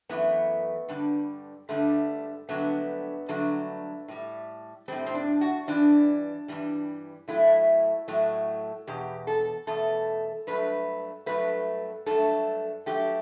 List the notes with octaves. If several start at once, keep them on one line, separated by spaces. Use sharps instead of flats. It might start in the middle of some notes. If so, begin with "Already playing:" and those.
F#2 E3 A3 B3
G2 D3 G3
G2 D3 G3 A3
G2 D3 F#3 A3 B3
G2 D3 F#3 A3
A2 G3
A2 G3 C4
C4
D4
F#4
G2 E3 G3 D4
G2 E3 G3
A2 F#3 A3 E4
A2 F#3 A3
E2 B2 G4
A4
E2 B2 A3 A4
G2 F#3 A3 B4
G2 F#3 A3 B4
G2 F#3 A3 A4
G2 F#3 A3 G4